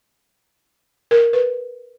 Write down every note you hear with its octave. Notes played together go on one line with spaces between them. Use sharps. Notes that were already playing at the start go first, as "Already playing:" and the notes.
A#4
B4